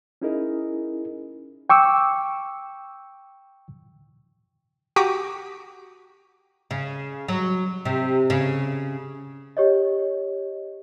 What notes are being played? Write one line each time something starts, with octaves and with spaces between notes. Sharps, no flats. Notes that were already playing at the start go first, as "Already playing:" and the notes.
C#4 D#4 E4 G#4 A#4 D#5
G5 C#6 D6 E6
F#4 G4 G5 A#5 D6 D#6
C#3
F#3
C3
C#3
G4 C#5 D#5